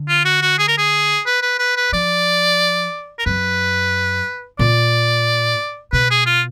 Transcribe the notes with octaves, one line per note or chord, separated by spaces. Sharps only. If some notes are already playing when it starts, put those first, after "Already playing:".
Already playing: D3
F4
F#4
F#4
G#4
A#4
G#4
B4
B4
B4
B4
F3 D5
A#4
F#2 B4
A#2 D5
B2 B4
G#4
F4